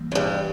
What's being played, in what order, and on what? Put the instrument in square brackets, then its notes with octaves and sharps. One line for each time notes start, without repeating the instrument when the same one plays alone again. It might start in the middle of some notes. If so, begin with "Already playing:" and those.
Already playing: [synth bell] E3 G3 A#3
[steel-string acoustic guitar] F#2
G2